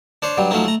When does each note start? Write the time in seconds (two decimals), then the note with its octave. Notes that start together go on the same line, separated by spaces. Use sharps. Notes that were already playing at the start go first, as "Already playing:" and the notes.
0.22 D4 C5 C#5
0.38 G2 F#3 G3
0.51 F3 F#3 A3 C#4 D#4
0.65 A3 A#5